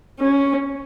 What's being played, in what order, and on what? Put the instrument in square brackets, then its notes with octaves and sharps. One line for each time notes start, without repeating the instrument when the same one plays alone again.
[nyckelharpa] C#4